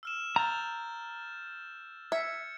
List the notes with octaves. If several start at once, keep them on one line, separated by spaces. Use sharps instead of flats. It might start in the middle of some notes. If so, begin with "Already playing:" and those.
E6 F6 E7
A#5 F6 G6 A6
E5 G#6 C#7